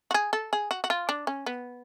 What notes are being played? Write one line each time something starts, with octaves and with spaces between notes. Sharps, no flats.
F#4
G#4
A4
G#4
F#4
F#4
F4
D4
C#4
B3